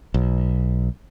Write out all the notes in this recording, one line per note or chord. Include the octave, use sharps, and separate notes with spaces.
B1